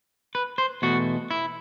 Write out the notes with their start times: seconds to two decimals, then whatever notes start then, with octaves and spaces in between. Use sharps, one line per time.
0.35 B4
0.58 C5
0.82 E2 B2 A3 F#4
1.31 E4